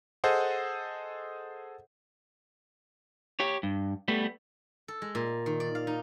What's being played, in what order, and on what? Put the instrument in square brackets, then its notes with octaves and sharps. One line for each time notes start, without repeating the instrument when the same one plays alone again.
[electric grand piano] G#4 A4 C5 D#5 F#5
[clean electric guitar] G4 C#5
G2
G3 A3 B3
[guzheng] A4
G#3
A#2
D#3
D5
F5
D#4